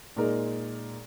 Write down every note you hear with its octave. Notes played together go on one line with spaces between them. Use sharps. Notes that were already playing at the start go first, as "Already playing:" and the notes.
A#2 G#3 D#4 A#4